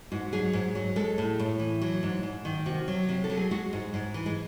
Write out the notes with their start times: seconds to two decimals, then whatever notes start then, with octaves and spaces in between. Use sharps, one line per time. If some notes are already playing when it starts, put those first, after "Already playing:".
0.12 G#2 F#4
0.33 F#3 G#4
0.53 G#2
0.75 F#3
0.96 G#3 A4
1.18 A2
1.39 A2
1.60 E3
1.81 F#3
2.03 G#2
2.23 G#2
2.45 D#3
2.66 C3 F#4
2.88 F#3
3.09 C3
3.24 A4
3.30 F#3
3.37 G#4
3.51 G#3 F#4
3.73 G#2
3.94 G#2
4.14 E3
4.26 G#3